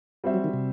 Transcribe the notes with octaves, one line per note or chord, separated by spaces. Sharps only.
G3 C4 F#4 C5 E5
F#3
D#3
C3